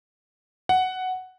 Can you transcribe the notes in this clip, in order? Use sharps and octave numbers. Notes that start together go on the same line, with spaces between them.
F#5